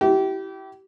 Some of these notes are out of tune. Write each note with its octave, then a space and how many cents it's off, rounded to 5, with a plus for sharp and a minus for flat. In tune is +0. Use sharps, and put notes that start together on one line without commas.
E4 +0 G4 -30